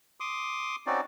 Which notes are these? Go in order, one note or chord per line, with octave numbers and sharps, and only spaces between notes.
C6 D6 D#6
C4 C#4 D#4 F#4 D5